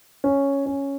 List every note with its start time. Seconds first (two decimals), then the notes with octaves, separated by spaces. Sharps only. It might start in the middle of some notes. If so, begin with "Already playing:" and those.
0.24 C#4
0.66 C#4